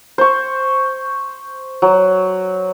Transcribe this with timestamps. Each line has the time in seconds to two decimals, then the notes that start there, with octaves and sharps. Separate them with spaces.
0.18 C5 C#6
1.82 F#3